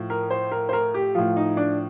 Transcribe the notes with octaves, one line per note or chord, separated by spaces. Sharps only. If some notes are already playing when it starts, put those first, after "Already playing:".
Already playing: A2 F3
A#4
C5
A#4
C5
A#4
G4
A2 F3 F4
D#4
D4